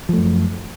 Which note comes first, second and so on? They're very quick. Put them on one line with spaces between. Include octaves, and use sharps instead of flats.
F3 A3 F#2